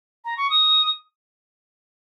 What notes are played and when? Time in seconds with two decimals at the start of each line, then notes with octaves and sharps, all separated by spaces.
0.25 A#5
0.37 C#6
0.50 D#6